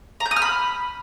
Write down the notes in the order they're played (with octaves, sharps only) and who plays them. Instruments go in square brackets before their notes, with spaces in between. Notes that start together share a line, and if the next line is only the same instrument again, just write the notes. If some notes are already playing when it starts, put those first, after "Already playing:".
[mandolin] A#5
G6
D#6
F6
B5